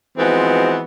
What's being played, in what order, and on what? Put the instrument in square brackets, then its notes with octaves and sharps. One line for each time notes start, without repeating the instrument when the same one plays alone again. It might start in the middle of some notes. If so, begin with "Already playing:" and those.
[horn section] E3 F3 G#3 B3 C4 F#4